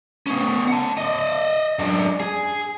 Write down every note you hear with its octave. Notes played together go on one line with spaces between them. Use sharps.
B3 C#4
F#5 A5
D5 D#5
F#2 D4
G#4